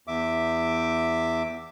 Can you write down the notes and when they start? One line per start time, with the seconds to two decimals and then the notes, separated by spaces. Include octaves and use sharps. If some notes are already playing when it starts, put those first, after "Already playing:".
0.07 E2 E5 D6